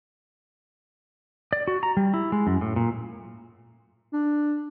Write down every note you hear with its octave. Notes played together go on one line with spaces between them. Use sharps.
D5
F#4
A#5
G3
E4
G#3
F#2
A2
A#2
D4